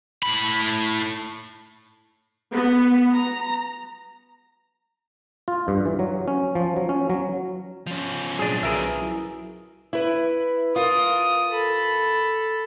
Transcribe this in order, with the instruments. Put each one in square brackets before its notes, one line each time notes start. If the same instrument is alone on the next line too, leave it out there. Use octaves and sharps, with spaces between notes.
[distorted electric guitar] A2 B5
[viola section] B3
A#5
[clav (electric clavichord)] F4
G2
E3
F#3
C#4
F3
F#3
C#4
F#3
[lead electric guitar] F3 C#4
[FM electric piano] A#2 F#3 [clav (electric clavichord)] D4 G#4
[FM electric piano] B1 B4 [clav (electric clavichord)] G#4 A#4 E5
[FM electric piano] F#3 E4
[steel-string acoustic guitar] E4 B4
[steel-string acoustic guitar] F4 [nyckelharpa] A#4 D#6
[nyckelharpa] A4 B5